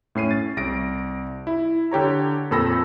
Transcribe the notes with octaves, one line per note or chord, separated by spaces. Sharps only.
A2 C#4 C7 D#7
A6
C2 A#6 D7
E4
D3 G4 C#5 A#5
F2 A#2 A4 B5 E6 A#6